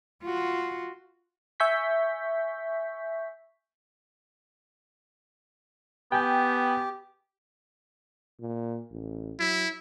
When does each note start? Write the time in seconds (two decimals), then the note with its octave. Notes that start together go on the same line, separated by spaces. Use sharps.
0.24 F4 F#4
1.60 E5 G#5 C#6 G6 B6
6.12 B3 G4 G5 G#5 G6
8.40 A#2
8.92 A1
9.39 F#3 E4